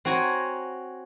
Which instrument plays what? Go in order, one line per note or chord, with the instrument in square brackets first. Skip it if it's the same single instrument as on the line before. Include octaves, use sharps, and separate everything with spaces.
[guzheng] C4 F#4 C#5 G#5 A#5